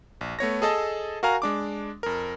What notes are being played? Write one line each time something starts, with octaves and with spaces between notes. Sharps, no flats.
A#1
A3 B3 C#5 A#6
G#4 A4 D#5 A5
F#4 A#4 F5 G#5 A#5
G#3 D4 D6
F2 A#4